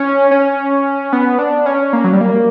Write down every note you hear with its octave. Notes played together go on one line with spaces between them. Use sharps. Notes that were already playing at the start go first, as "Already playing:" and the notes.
Already playing: C#4
C#4
B3
D4
C#4
A#3
F#3
G3
A#3